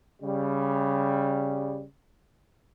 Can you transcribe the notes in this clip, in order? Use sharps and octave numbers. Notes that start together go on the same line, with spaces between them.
C#3 G3